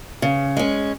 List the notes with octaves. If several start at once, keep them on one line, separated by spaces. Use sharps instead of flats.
C#3
G#3 C#4